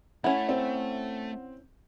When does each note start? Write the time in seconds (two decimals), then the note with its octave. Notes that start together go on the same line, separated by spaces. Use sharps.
0.24 A3 C#4 E4 F#5
0.49 C4